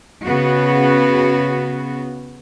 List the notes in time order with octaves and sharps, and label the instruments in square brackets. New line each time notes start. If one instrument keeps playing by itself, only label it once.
[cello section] C#3 B3 F#4